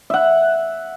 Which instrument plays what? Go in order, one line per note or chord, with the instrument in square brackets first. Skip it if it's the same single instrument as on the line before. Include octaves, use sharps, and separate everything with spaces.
[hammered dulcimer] E5 F#5